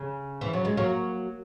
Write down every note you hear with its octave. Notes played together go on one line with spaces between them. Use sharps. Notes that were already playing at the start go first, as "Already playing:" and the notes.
Already playing: C#3
E3
F#3
G#3
F#3 A#3